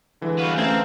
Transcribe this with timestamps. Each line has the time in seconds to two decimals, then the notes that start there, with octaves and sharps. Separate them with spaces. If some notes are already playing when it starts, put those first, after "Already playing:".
0.21 D3 E3 G#3
0.38 G3 B3 F#4 B4 F5
0.57 A3 C4 C#4 A4 F5 A#5 G#6